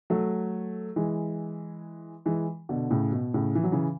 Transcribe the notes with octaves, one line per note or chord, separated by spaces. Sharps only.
F#3 A3
E3 G#3
E3 G#3
B2 D3
A2 C#3
B2
A2 C#3
E3
F#3
C#3 E3